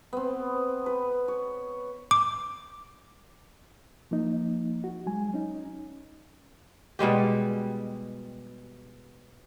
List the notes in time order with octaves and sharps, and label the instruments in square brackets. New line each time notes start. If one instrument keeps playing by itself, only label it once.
[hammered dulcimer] B3 C4
B4
C#5
[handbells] D6
[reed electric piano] F3 A#3 D#4
F#4
F#3 G#3 G#5
C#4 D#4
[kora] B2 G3 G#3 G4